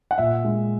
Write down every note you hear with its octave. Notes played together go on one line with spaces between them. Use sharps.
F#5
A#2 E5
G#3